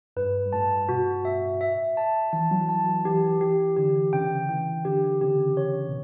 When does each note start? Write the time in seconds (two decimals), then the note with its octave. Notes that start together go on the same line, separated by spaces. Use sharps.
0.16 G2 B4
0.46 G2
0.53 A2 A5
0.89 B2 F#4
1.25 E5
1.61 E5
1.97 A5
2.33 E3 A5
2.51 F#3
2.69 A5
2.86 F#3
3.05 E3 G4
3.41 E3 G4
3.77 D3 G4
4.13 C#3 G5
4.49 E3 G5
4.85 D3 G4
5.21 C#3 G4
5.57 C#3 C#5
5.89 B2